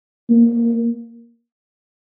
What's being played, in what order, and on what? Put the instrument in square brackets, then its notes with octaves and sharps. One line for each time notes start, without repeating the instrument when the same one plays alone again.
[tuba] A#3